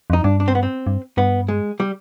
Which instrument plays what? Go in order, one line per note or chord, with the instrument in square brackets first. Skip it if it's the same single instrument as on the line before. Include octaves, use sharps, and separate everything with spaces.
[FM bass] F2 [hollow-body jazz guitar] D#4
[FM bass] G2 [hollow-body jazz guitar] D4
[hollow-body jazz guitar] D4
C4
B3
C4
[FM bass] G2
[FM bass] G2 [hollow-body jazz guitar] B3
[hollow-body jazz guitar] G#3
G3